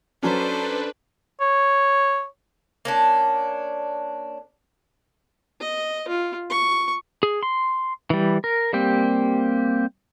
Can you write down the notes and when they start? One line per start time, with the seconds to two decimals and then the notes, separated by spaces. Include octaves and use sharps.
0.23 F#3 C#4 D4 A4 B4 C5
1.40 C#5
2.85 A#3 C#4 D4
5.60 D#5
6.08 F4
6.50 C#6
7.23 G#4
7.43 C6
8.10 E3 G3
8.44 A#4
8.73 G3 A#3 C4 G4